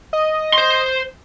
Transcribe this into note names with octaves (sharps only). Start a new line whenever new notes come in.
D#5
C5 C6